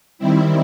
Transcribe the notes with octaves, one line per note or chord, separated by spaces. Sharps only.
D#3 G3 C4 E4